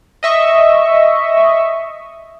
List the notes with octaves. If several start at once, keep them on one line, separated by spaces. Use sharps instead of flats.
D#5 E5 C#6